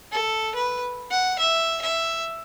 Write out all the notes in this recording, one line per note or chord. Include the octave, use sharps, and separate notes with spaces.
A4
B4
F#5
E5
E5